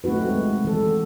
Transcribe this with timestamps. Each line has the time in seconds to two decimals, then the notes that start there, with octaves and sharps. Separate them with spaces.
0.04 A3 C4 D#4 F#4 B4
0.29 G#3
0.65 E3 A4